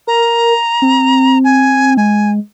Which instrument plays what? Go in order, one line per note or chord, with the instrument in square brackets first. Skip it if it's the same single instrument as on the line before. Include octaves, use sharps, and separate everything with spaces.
[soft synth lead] A#4 [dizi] A#5
[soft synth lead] C4
[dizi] G#5
[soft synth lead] G#3 [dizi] G#5